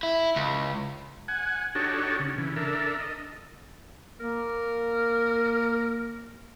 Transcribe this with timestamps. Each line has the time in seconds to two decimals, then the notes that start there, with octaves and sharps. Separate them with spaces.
0.03 E4
0.36 C#2
1.28 F#5 G#5
1.75 D4 D#4 F#4 G4 A4 C#5
2.19 C#3
2.38 C#3 E3
2.56 D4 A4 A#4 E5
3.00 D#5
4.20 A#3 A#4